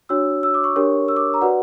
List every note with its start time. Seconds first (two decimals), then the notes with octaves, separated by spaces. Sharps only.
0.09 D4 F#4 C#5 E6
0.43 E6
0.54 D6
0.64 C#6
0.76 D4 G4 A#4 C#5
1.08 E6
1.16 D6
1.34 A#5
1.41 F#4 B4 D5 F#5